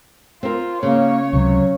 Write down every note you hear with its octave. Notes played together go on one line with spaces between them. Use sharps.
C4 F4 A#4
C#3 A#3 C#5
C#2 C3 F#3